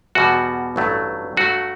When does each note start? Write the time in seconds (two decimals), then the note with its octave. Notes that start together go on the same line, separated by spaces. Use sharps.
0.15 E2 B2 G3 F#4
0.76 A1 G2 F#3 A3
1.37 G2 F#3 A3 F#4